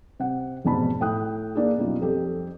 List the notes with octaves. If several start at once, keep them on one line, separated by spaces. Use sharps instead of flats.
C3 F#5
F1 G#2 B2 A5 B5
A2 G5 D#6 F#6
A#3 D4 G#4
F#2 B2 G3 D#4 F4
F2 G4 A4